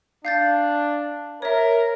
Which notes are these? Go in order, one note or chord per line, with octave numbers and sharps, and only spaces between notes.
D4 F5 G6 A6
A#4 C#5 E5